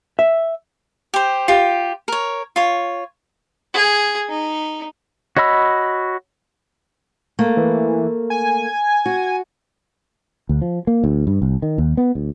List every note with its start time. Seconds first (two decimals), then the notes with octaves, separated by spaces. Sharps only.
0.19 E5
1.14 G4 C5
1.48 F4 G4
2.08 A#4 C#5
2.56 F4 C#5
3.74 G#4
4.29 D#4
5.37 F#4 C#5 D#5 B5 E6
7.39 A3 A#3
7.57 E3
8.30 G#5
9.06 F#4
10.49 D2
10.62 F3
10.87 A#3
11.04 D2
11.27 G2
11.42 C2
11.62 D#3
11.78 D#2
11.97 B3
12.15 D2